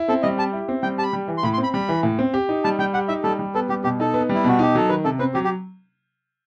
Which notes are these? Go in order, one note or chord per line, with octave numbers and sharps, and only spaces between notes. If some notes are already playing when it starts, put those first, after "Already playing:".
Already playing: E4
C4 A4
G3 D#5
G4 A5
E4
C4
G3 G5
G4 A5 B5
G3
E3
C6
A2 B5
C6
C4
B5
G3 B5
E3
A2
C4
G4
D#4
G3 A5
G3 G5
G4 F#5
D#4 E5
G3 A4
G3
B3 A4
G3 G4
B2 G4
D#4 A4
B3
G3
E4
B2 F#4
D#4 G4
F#3 A4
D#3 B4
C3 A4
C4 B4
F#3 G4
G4